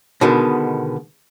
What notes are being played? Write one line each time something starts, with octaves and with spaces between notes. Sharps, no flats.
B2 D3 D#3 G#3 B3